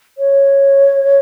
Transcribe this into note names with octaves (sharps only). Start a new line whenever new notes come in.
C#5